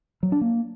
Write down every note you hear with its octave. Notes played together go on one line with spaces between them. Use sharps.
F#3
D4
A#3